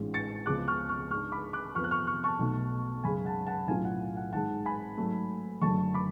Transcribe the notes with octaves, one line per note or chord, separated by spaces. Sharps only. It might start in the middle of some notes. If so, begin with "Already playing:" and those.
Already playing: A1 G#2 G#3 C#4 F4
A6 C#7
C#2 C#3 F3 G#3 B3 D6 F#6
C#6 F6
C#6 F6
G#2 G#3 D4 C#6 F6
B5 D6
D6 F#6
F2 F3 B3 C#6 F6
F#6
C#6 F6
C#6 F6
A5 C#6
B1 B2 A3
F#2 C#3 G#3 G#5 B5
F#5 A5
F#5 A5
B1 A2 F#3 C#4 F4 F5 G#5
F#5
F#5
G#1 G#2 G#3 F#5 A5
G#5 B5
G#2 F#3 A3
F#1 F#2 D3 F#3 A3 A5 C#6
B5 D6